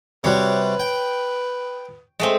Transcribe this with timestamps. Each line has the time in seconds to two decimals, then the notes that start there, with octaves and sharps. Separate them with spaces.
0.24 C3 G3 F#4 B4 C#5
0.80 G5
2.20 G#3 A3 C4